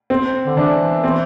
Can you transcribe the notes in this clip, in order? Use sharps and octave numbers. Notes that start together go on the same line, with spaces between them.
C4
D3
E3 D4
C4